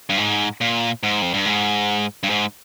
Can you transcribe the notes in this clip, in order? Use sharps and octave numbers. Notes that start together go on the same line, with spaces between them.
G2
G#2
A#2
G#2
F2
G2
G#2
G2
G#2